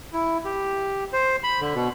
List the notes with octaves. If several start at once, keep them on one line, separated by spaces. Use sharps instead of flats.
E4
G4
C5
B5
D3
B2